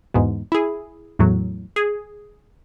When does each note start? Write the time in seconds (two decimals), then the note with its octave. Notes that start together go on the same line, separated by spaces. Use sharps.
0.14 E2 G#2 B2
0.52 E4 G#4
1.19 E2 A2 F#3
1.76 G#4